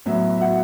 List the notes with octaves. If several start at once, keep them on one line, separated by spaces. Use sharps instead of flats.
A2 F#3 B3 E5
E5
F#4 F#5